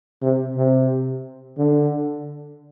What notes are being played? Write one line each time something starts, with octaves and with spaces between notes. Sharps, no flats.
C3
C3
D3